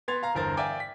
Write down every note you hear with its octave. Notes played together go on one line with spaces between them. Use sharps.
B3 C6 G#6 A6 F7
F5 A#5
G1 E2 A#4 C5 A6
D5 E5 F5 G5 G#5 D6
B6